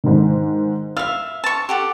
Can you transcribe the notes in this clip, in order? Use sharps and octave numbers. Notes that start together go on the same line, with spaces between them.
G#2 D#3
E5 F5 E6
A5 C#6
G4 A4 F#5